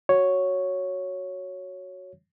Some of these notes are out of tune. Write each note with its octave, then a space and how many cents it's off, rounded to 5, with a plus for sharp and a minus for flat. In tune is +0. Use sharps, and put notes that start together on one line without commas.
F#4 +0 C#5 +0